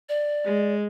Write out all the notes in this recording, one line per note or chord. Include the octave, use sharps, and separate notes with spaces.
D5
G#3